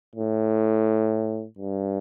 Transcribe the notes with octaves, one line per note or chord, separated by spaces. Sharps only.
A2
G2